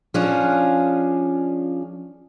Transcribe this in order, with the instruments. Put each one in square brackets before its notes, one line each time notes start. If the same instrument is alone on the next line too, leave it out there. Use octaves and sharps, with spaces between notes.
[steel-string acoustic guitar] F3 C#4 D4 F4 G#4